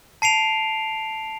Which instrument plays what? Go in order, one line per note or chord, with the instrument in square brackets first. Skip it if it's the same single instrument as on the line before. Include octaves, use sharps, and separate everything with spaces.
[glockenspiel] A5 C7 D7 F7